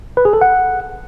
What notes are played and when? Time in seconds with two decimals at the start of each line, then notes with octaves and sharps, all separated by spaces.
0.17 B4
0.25 G#4
0.33 A4
0.41 F#5